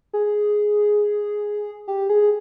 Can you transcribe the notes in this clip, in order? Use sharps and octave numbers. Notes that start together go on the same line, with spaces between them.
G#4
G4
G#4